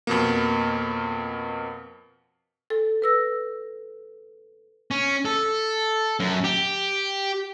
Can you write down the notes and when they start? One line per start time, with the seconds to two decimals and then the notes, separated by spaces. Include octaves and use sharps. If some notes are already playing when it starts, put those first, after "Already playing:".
0.07 F2 B2 A#3
2.70 A4
3.02 B4 E6 A#6
4.91 C#4
5.25 A4
6.20 F#2
6.44 G4